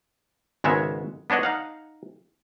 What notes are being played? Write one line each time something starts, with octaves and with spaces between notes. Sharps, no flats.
G#1 C#3 G#3 B3 C#5 E5
B3 D4 C#5 D#5 F#5
D#4 F5 F#5